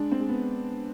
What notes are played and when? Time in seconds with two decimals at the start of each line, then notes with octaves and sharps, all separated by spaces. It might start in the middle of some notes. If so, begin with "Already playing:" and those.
Already playing: G#3 D4
0.12 C4
0.20 G#3
0.29 B3